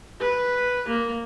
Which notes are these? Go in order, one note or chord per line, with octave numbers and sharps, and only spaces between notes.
B4
A#3